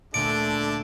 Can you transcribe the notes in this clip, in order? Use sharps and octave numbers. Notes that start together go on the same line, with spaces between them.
D2 A#2 D3 A3 D4 D5 D7